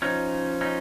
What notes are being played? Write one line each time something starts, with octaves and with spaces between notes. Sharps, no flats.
F3 C#4 D#4
C#4 D#4